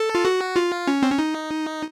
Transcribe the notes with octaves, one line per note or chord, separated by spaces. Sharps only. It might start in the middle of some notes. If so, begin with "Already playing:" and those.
Already playing: A4
F4
F#4
F4
C#4
C4
C#4
D#4